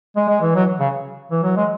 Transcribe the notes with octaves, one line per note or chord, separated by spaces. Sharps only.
G#3
G#3
E3
F#3
C#3
E3
F#3
G#3